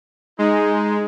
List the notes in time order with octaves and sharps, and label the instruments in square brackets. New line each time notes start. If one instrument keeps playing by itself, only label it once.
[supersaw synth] G#3 [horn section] D#4